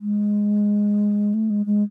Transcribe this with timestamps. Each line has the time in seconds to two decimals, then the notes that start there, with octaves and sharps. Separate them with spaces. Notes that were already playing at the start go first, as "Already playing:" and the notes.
0.01 G#3
1.34 A3
1.50 G#3
1.66 G#3